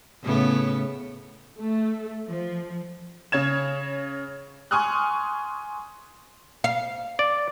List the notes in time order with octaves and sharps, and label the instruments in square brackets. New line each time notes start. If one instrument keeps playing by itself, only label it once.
[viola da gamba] A2 C#3 B3
[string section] A3
F3
[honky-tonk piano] C#3 C#5 G#6 E7
G#5 C6 C#6 D#6 F6 F#6
[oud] F5
[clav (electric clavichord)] D5